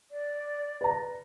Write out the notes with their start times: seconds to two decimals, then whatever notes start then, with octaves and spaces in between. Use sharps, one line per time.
0.11 D5
0.81 B4 A#5